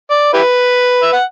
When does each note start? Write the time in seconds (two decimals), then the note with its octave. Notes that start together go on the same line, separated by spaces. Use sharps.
0.11 D5
0.33 E4 G4 B4
1.03 E5
1.13 F#5